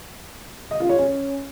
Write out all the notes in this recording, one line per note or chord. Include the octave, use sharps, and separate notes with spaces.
D#5
F4
C#5
C#4